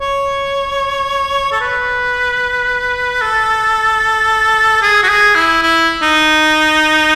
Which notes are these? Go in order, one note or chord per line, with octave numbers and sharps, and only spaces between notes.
C#5
A4
B4
A4
G#4
F#4
G#4
E4
E4
D#4